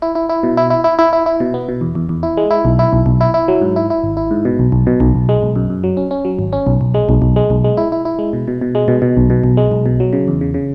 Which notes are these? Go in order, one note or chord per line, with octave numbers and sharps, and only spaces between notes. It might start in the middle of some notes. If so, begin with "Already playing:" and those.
E4
E4
E4
B2
E4
E4
E4
E4
E4
E4
B2
B3
B2
E2
E2
E2
E4
G#3
E4
B1
E4
B1
B1
E4
E4
F#3
G#2
E4
E4
G#1
E4
G#2
B2
B1
B1
B2
B1
B1
G#3
B1
F#2
F#2
F#3
C#4
C#4
F#3
G#1
C#4
B1
B1
G#3
B1
B1
G#3
B1
G#3
E4
E4
E4
G#3
B2
B2
B2
G#3
B2
B2
B1
B2
B1
G#3
B1
B2
F#3
C#3
E2
C#3
C#3